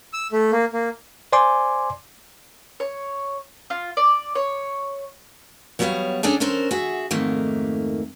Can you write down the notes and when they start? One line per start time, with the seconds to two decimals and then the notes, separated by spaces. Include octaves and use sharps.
0.13 E6
0.32 A3
0.52 A#3
0.73 A#3
1.33 C5 D5 G#5 C6 D6
2.80 C#5
3.70 F4
3.97 D5
4.35 C#5
5.79 F#3 G3 B3 C5 C#5 F5
6.23 C#4 D4 G#4 A4 D5
6.40 C#4 D4 A4 A#4 C5
6.71 F#4 G#4 E5
7.11 F2 G#2 D#3 A3 A#3